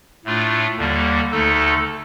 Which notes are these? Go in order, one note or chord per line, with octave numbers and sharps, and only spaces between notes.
A2 A3 D4 F4
D#2 D3 G3 A#3
D2 D3 A3 D#4 A4